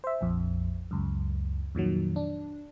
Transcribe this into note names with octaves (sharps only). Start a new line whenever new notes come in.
C5 E5
A#1 F2
C#2 F#2
F2 A#2 D#3 F#3
D4